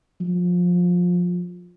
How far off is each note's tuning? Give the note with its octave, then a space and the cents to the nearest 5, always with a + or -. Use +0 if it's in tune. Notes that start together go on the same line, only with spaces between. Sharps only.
F3 +20